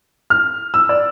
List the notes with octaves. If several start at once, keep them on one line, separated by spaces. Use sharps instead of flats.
F6
E6
D5